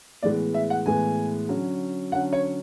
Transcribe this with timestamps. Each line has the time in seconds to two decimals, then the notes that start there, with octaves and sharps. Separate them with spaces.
0.23 A2 E3 G#3 B3 D5
0.54 E5
0.70 F#5
0.86 A2 E3 G#3 B3 G#5
1.49 D3 F#3 C#4
2.12 D3 F#3 C#4 F#5
2.33 C#5